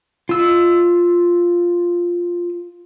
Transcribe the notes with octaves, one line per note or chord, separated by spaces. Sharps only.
F4 E6